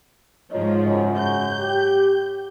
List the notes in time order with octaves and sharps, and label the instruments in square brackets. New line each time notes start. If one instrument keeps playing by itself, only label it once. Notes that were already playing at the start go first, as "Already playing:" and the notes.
[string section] G#2 F3 [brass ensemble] A#4 C#5 D#5
[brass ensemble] F#2 C#3
[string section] G6
[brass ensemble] G4